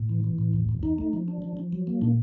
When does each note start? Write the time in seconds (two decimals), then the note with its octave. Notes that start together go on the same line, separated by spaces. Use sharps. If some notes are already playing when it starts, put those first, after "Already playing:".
Already playing: A2
0.09 E3
0.24 E3
0.38 A2
0.53 E2
0.69 E2
0.83 E2 D#4
0.98 A3
1.13 F3
1.28 D4
1.42 F3
1.57 F3
1.73 F#3
1.87 A#3
2.02 A#2 D4